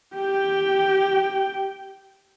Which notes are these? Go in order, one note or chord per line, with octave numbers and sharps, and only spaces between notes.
G4 G5